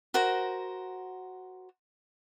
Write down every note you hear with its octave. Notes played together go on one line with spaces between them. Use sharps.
F#4 A#4 C5